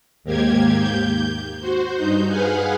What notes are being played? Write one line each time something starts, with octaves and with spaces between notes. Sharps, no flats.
D#2 G#2 A#3 G4 G#6
G6
F#4 C5
G2 D#4 G6
G#4 B4 F5 F#5 G#5